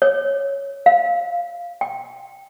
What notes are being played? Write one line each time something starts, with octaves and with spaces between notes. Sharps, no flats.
C#5
F5
G5